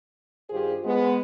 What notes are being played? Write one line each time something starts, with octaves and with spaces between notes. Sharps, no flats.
G2 D#3 F4 G4 G#4 C5
G#3 B3